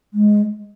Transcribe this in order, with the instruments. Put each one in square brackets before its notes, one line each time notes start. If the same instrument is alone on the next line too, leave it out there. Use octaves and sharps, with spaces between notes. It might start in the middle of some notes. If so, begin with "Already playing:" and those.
[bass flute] G#3